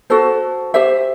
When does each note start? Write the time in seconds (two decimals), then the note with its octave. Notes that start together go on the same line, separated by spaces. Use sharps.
0.10 F#4 A4 C5
0.74 G4 C5 E5